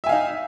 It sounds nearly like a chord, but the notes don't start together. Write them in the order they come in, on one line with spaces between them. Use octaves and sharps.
E5 G#5 F5 D#4